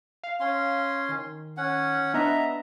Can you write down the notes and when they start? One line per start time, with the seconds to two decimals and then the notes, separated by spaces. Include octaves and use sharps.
0.23 F5
0.40 C#4 C6
1.09 D#3
1.57 C#4 F#5
2.14 B3 D4 D#5 E5 A#5